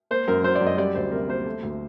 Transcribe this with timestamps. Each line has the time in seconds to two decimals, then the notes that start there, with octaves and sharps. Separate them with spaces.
0.11 A#3 C5
0.28 F#2 A#4
0.44 F#3 C5
0.55 D5
0.61 F#2
0.67 D#5
0.78 G3 D5
0.95 D2 C5
1.12 C3 A#4
1.28 A#3 C5
1.46 A3
1.63 D2